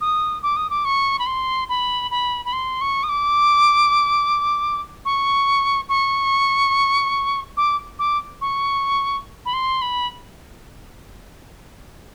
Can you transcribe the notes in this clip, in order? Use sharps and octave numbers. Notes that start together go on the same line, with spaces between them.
D#6
D6
D#6
D6
C#6
B5
C6
B5
B5
B5
C6
C#6
D#6
D6
C#6
C#6
D6
D6
C#6
B5
C6
B5